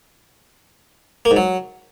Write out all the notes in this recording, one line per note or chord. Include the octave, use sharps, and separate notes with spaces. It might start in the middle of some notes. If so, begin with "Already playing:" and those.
A#3
G#2
F#3